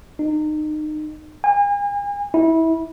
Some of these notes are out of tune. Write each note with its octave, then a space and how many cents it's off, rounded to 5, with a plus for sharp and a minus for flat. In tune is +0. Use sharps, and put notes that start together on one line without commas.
D#4 -30
G#5 -40
E4 -25